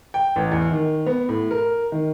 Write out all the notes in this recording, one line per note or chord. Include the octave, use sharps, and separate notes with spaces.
G5
A1
E2
D#3
B3
A2
A#4
D#3